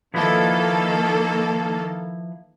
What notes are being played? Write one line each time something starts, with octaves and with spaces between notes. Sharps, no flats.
D#3 F3 A#3 E4 A4 B4